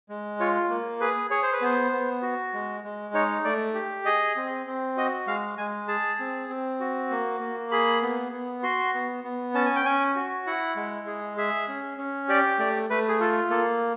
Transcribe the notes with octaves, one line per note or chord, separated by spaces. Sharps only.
G#3
F4 C#5
A#3
G#4 B4
G#4 C#5
C5
B4
B3 C5
B3
F#4
G#3
G#3
D#4 C#5
A3 D5
G4
G#4 D#5
C4
C4
F#4 D#5
G#3 F5
G#3 G#5
G#4 A5
C4
C4
F#4
A#3
A#3
G#4 B5
B3
B3
F#4 C6
B3
B3
C#4 A5
G#5
G5
C#4 G#5
F#4
E4 F#5
G#3
G#4
G#4 E5
C#4
C#4
G4 D5
A3 D5
A3 B4
G#4
F4 A4
A#3 A4